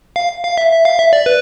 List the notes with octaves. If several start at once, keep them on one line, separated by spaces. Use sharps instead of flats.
F5
F5
E5
E5
F5
E5
D5
B4